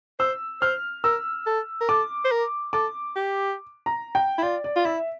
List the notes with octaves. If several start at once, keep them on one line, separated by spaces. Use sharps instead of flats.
C5 E6
C5 F6
A#4 E6
A4
A#4
A4 D6
C5
A#4
A4 D6
G4
A#5
G5
E4
F4 D5
D5
F4
E4 E5